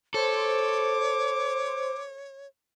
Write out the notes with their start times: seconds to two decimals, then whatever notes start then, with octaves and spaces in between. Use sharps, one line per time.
0.14 A4 C5 C#5 D6